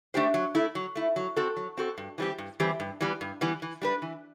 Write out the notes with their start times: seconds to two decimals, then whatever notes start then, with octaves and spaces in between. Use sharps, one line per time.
0.14 A3 D4 G4 C5
0.34 F#3
0.55 A3 E4
0.75 F#3
0.95 A3 E4
1.16 F#3
1.36 C4 F#4 A4
1.57 F#3
1.77 C4 F#4 A4
1.98 G2
2.18 E3 G3 C4 G4
2.38 G2
2.60 E3 G3 C4 G4
2.80 G2
3.01 E3 G3 B3
3.21 G2
3.41 E3 G3 B3
3.62 E3
3.82 G3 D4 G4 B4
4.02 E3